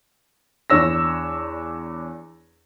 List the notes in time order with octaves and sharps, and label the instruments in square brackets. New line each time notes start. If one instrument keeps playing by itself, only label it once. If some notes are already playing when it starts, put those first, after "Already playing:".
[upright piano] E2 D4 C#5 E6 A#6